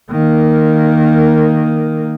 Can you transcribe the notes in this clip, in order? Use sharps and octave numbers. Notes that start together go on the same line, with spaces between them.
D#3 A#3